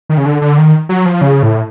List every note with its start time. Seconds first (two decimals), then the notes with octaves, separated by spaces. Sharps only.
0.09 D#3
0.18 C#3
0.26 D3
0.42 D3
0.58 D#3
0.89 F#3
1.06 F3
1.21 C#3
1.43 A2